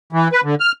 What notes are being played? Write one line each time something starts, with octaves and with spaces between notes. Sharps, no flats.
E3
B4
D3
F6